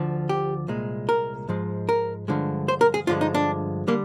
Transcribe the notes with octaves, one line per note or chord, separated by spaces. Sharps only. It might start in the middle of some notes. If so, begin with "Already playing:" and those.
Already playing: D2 D3 F3
G4
C2 A#2 G#3
A#4
G#2 F3 G#3
A#4
G2 D3 F3 G#3
C5
A#4
G#4
G2 D3 F3 G#3 F4
D#4
D4
D3 G3 A#3